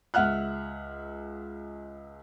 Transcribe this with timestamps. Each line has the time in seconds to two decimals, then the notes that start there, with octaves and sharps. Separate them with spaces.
0.14 C#2 E5 F#5 F6 F#6